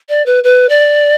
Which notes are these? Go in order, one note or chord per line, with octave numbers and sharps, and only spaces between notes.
D5
B4
B4
D5